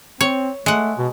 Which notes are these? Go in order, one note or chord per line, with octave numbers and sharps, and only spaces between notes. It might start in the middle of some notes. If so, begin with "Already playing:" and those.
C4 C#5
G#3 A3 F#5
B2